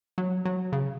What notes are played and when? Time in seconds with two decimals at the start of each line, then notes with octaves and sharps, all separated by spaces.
0.18 F#3
0.45 F#3
0.73 C#3